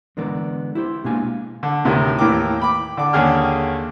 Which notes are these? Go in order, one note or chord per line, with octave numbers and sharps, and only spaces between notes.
D3 E3 G#3 B3 A#4 D5
E4 G4 C5
B2 G#3 A#3 D4 F5 G#5
D3
D2 A2 C3 D#3
D#2 A2 E3 A#4 G5 D6
G5 B5 D6
D3 D5 D6
D#2 D3 C#4 G#4 G5 F6